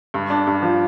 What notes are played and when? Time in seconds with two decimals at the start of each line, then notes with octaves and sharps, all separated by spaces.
0.14 G2
0.30 D4
0.47 G2
0.62 F3